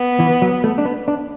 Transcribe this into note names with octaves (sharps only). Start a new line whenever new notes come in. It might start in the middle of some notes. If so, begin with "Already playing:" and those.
Already playing: B3
E3
F#3
A3
D4
B3
D4